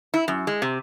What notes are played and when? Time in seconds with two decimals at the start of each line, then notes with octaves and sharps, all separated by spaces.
0.14 E4
0.28 F#2
0.47 G#3
0.62 C3